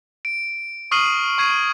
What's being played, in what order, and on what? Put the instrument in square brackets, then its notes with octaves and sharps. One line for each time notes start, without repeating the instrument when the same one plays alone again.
[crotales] D7
C#6 D#6 F6 C7 D#7 F#7
C#6 G#6 C7 D#7